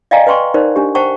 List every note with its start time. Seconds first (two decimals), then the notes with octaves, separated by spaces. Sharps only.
0.11 D5 D#5 F5 G5 G#5 A#5
0.27 B4 G5 C6 C#6
0.54 D#4 A#4 C5 D5
0.76 D4 G4
0.95 C5 F#5 G5 A5 C#6